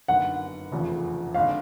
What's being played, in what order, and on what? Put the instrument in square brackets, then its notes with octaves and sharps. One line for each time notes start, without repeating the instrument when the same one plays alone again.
[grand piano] G1 F#2 D#3 [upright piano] F#5
[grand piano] F1 E2 C#3 F3
[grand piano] G#1 D3 [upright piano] F5